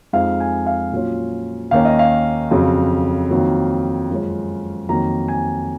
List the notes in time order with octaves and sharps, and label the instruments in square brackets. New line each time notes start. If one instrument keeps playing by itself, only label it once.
[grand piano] F2 F3 G#3 D#4 F5
G#5
F5
A#2 F#3 C#4 F4
D#2 D#3 A#3 C#4 F5
D#5
F5
F2 C#3 F#3
F2 D#3 F#3 A#3
F#2 F3 G#3 C#4
F2 D#3 F#3 A#3 A#5
G#5